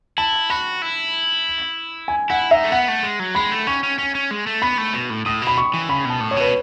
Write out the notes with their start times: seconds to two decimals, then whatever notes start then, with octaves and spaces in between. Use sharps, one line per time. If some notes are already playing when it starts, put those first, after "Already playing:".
0.18 E4 A5
0.50 F#4 B5
0.82 E4
2.08 G#5
2.30 E4 F#5
2.51 D#4 E5
2.64 A3
2.72 B3 F#5
2.88 A3
3.03 G#3
3.19 F#3
3.35 G#3 B5
3.51 A3
3.67 C#4 C#6
3.83 C#4
3.99 C#4
4.15 C#4
4.31 G#3
4.47 A3
4.62 B3 B5
4.78 A3
4.93 B2
5.10 A2
5.25 A2 D#6
5.42 B2
5.47 B5
5.57 C#6
5.74 E3
5.89 C#3 B5
6.05 B2 A5
6.21 A2
6.31 C#5
6.36 B2 B4